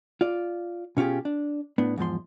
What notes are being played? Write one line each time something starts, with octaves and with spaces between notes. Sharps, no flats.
F4 D5
B2 C#4 F4 G4 G#4
D4
A2 B3 D4
E2 G#2 F3 C6